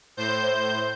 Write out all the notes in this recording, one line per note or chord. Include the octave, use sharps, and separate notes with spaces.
A2 C5 G6